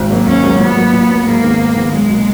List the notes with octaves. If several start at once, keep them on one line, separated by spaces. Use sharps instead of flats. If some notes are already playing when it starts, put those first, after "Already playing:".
Already playing: G#1
G#2 F#3 A#3
G#1 C#4
G#2 F#3 A#3
A#2 B3
F#3 A#3
A#2
F#3 A#3
G#2 A#3
D#3 G#3 B3
G#2
D#3 G#3 B3
B1 G#3
B2 A#3